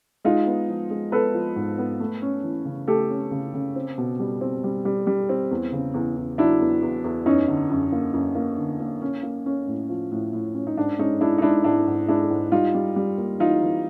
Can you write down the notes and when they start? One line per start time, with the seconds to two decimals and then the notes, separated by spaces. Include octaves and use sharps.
0.24 G#3 D#4 F4
0.47 B3
0.68 F3
0.90 G#3
1.12 B3 A4 B4
1.34 F3
1.56 G#2
1.78 B3
2.00 A3
2.22 C#4
2.43 E3
2.65 C#3
2.88 A3 G4 A4
3.10 C#4
3.31 C#3
3.54 C#3
3.76 C4
3.98 B2
4.19 G3
4.41 C4
4.64 G3
4.85 G3
5.07 G3
5.29 C4
5.51 E2
5.72 C#3
5.94 E2
6.16 E2
6.38 F#3 D4 E4
6.61 E2
6.82 E2
7.04 E2
7.26 F#2 C#4 D#4
7.48 D3
7.70 F#2
7.92 A#3
8.13 F#2
8.35 A#3
8.58 D3
8.80 A#3
9.02 C#4
9.23 A#3
9.46 C#4
9.67 A2
9.89 F3
10.11 A2
10.33 A2
10.54 C#4
10.67 D#4
10.77 G#2 D4
10.99 G#3 C#4 D#4
11.21 G#3 D4 E4
11.38 D#4
11.42 G#3 D4 E4
11.64 G#2 D4 E4
11.87 G#2
12.08 G#3 D4 E4
12.30 G#2
12.52 G3 D#4 F4
12.74 G3
12.96 G3
13.18 A#3
13.40 E3 D#4 F4
13.62 E3